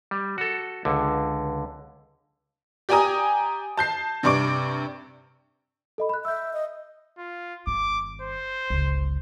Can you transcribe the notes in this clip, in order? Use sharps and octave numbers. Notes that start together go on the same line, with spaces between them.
G3
F#4 A4
C#2 D3
G4 D5 G5 G#5 A#5 D#6
A5 G6 C7
G2 C3 D5 C#6 D6 D7
A4 D#5 B5
B5 F#6
E5 E6 G6
D#5
F4
G1 D#3 D6
C5
G1 C#2